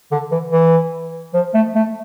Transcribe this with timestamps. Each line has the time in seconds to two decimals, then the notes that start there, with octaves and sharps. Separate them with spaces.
0.11 D3
0.31 E3
0.52 E3
1.34 F3
1.54 A3
1.75 A3